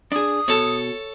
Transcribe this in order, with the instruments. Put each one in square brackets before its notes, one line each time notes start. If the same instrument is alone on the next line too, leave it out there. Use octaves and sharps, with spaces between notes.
[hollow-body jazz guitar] D4 G#4 [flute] D#6
[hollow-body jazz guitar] B2 [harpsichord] A4 C#5